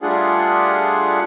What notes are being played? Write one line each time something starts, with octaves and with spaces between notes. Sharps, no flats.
G3 A3 D4 F4 G#4 F#5